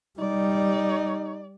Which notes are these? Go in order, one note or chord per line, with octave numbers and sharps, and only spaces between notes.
G3 D#4 D5